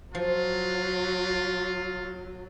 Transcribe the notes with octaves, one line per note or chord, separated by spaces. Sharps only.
F3 F#3 F4